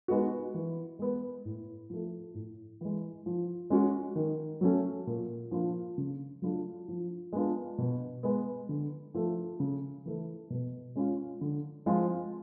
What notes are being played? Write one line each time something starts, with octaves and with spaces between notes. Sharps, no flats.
G#3 B3 D#4 F#4
E3
G#3 B3
A2
F3 A3
A2
E3 G#3
F3
G#3 C#4 F#4
D#3
F#3 A3 C#4
A#2
F3 A#3 D4 F4
C#3
F#3 A3 D4 F4
F3
G#3 B3 D4 F4
B2
G#3 B3
D3
F3 A3
C#3
E3 A3
B2
G#3 C#4 F4
D3
F3 G#3 C4 F4